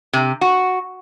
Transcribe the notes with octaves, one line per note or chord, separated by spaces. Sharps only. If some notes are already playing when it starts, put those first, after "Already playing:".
C3
F#4